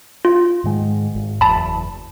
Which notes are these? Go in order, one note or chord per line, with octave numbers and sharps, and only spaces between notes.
F4
G#2 D#3 G#3
G#1
F#1 E2 A5 B5